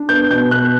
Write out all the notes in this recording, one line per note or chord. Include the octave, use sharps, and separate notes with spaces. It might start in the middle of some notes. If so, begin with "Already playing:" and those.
Already playing: D4
B3 G6
B2 G6
B3 F#6